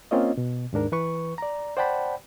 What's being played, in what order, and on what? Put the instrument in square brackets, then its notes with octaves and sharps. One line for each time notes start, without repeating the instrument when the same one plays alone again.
[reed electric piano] A#3 C4 C#4 F4 C#5 D#5
B2
D#2 G#2 D4 A#4
E3 B4 C#6
D5 A#5
C5 D5 F#5 G5 A5 B5